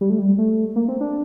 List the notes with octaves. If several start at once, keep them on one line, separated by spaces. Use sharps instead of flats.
G3
A3
G3
A3
A#3
C4
D4